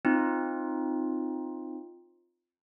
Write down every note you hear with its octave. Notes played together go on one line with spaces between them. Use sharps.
C4 D#4 F4